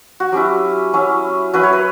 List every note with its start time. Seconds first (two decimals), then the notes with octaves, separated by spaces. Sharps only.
0.20 F#4
0.32 F#3 C#4 E4 G4
0.93 F#3 C#4 E4
1.53 F#3 C#4 E4 B4
1.63 C#5
1.73 B4